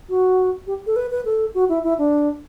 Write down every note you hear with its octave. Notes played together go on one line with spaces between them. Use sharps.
F#4
G4
A4
B4
B4
A4
F#4
E4
E4
D4